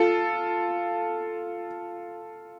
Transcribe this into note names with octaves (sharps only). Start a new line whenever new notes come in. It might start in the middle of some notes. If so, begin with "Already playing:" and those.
Already playing: F4 A4